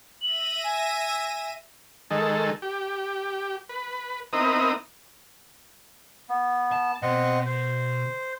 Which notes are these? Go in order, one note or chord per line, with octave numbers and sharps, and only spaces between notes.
E5 A#6 D#7 F#7
G#5
D#3 G#3 A4
G4
B4
B3 C4 D#4 E4 A#4 D#6
B3
A5
B2 C4 D#5 F#5
C5